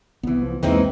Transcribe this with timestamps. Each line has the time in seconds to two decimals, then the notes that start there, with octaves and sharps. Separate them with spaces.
0.23 C2 E3 B3
0.42 F3
0.63 B1 E2 E3 G#3 A#3 C4 D#4